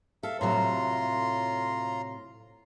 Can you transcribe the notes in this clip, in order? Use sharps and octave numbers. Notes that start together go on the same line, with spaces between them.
A4 E5 F5
A2 C3 F#3 F4 A#5 C6